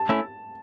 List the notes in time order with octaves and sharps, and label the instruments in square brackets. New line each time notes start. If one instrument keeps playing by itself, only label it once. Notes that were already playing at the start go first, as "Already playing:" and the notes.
Already playing: [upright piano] A5
[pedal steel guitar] A3 C#4 E4